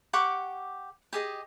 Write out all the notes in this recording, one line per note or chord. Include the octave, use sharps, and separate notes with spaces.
G4 F#5 C#6 D6
G4 G#4 D#5